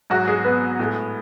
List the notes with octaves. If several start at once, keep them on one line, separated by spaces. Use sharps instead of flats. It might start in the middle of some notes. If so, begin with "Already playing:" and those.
G#2 F#3 G#3 F#4
G#3 G#4
B3 B4
A2 G#3